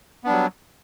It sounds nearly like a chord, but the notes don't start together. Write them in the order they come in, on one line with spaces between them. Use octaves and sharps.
B3 D4 G3 F#3